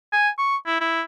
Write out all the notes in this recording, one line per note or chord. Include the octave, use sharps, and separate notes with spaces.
G#5
C#6
E4
E4